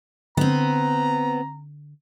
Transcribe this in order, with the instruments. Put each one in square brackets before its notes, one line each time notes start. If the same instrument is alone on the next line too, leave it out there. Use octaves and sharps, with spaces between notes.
[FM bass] D3 [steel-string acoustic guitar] B3 C4 [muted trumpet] A#5